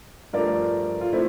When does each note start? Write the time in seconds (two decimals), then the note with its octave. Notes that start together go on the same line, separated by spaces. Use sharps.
0.33 G2 F3 A3 A#4 D5
1.01 F4
1.13 F3 A3 C4 E4